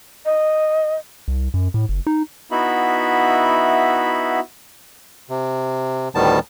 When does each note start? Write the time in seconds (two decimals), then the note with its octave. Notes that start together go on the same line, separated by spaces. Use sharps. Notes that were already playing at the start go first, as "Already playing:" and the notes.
0.25 D#5
1.28 C2
1.54 F#2
1.74 A2
1.89 F#1
2.07 D#4
2.51 B3 D#4 E4 F#4 E5 B5
5.29 C3
6.15 D2 A2 D#3 G3 B3 A5